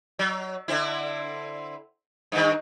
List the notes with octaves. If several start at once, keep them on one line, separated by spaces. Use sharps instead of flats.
F#3
D3 C4 E4
G2 D#3